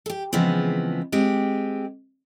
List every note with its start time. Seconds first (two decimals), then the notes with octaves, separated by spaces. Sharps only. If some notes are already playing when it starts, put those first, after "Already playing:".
0.06 G4 A4
0.33 C#3 E3 F3 G#3 B3 C4
1.12 G#3 C4 G4